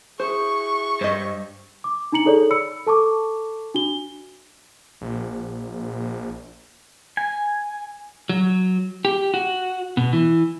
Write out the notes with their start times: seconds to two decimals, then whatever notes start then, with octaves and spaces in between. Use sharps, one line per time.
0.20 E4 F#4 G#4 C5 C#6
1.01 G2 C5 D#5
1.84 D6
2.12 D4 D#4 A#5 C#7 F#7
2.25 D#4 G#4 A4 C#5 D5
2.51 B5 E6 C#7
2.86 A4 A5 C#6 D6
3.74 D4 F#4 G7
5.01 A#1
7.17 G#5
8.29 F#3
9.05 G4
9.34 F#4
9.97 B2
10.13 E3